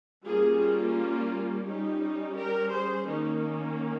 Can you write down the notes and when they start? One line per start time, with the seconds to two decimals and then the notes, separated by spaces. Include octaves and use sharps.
0.25 G3 A#3 C#4 F4 G#4
0.60 F4
1.65 G3 C#4 D#4 G4
2.36 G4 A#4
2.70 G#4 C5
3.05 D#3 A#3 C#4 D#4